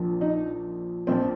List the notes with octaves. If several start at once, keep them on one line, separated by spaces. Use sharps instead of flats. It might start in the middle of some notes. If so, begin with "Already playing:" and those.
Already playing: A#1 A#2 F3
D#4
A#1 A#2 F3 C4